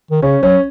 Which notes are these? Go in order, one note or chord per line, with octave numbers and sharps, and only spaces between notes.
D#3
C#3 C#4
F#3 C#4